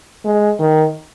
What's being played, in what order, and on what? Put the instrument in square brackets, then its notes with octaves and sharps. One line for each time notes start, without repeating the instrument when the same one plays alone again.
[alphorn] G#3
D#3